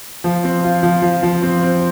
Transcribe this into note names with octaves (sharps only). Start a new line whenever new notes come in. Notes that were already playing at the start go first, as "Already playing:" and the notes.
F3
C4
F4
F3
F3
F3
C4
C4